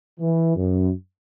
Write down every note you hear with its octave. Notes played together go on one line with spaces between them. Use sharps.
E3
F#2